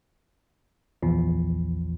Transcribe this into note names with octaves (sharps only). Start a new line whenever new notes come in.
A#1 E2 F3